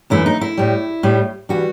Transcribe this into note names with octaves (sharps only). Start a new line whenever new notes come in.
F#2 E3 A3 E4
D#4
E4
A2 G3
A2 G3
E3 G3 F#4